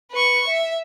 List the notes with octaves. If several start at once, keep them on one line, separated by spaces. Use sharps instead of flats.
B4 C#6
E5